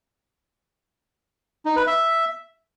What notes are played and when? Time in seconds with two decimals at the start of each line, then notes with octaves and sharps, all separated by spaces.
1.66 D#4
1.76 B4
1.87 E5